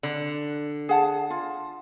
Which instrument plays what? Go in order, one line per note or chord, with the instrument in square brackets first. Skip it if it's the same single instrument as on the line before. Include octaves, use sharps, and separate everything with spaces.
[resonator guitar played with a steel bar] D3
[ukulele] G#4 F#5 A5
F4